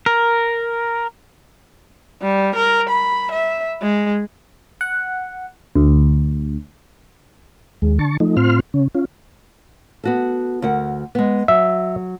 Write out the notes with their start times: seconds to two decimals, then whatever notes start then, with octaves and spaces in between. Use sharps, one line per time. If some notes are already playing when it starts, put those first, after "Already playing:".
0.06 A#4
2.21 G3
2.56 A#4
2.89 B5
3.31 E5
3.81 G#3
4.81 F#5
5.76 D2
7.82 D#2 G#3
7.99 D3 A5 C#6
8.20 F3 A3 D#4
8.37 A2 C4 F4 C6 F6
8.74 C#3 C#4
8.95 C#4 F4
10.04 B3 F#4 A4
10.62 D2 A#4 F#5
11.15 G#3 B3
11.48 F#3 E5